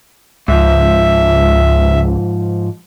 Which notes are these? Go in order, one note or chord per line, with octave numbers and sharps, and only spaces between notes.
C#2 G#2 F3 E5